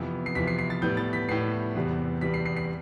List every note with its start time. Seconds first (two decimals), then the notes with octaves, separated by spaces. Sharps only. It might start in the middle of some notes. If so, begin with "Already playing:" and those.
Already playing: F2 C3 E3 B3
0.26 C7
0.35 F2 C3 E3 B3 B6
0.47 C7
0.58 C7
0.70 A6
0.82 A2 G3 B3 G6
0.97 A6
1.13 B6
1.29 A2 G3 B3 C7
1.75 E2 C3 G3 B3
2.21 E2 C3 G3 B3 B6
2.34 C7
2.46 C7
2.56 C7